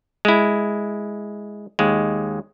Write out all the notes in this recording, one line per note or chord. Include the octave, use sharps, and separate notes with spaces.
G#3 E4
D#2 G#3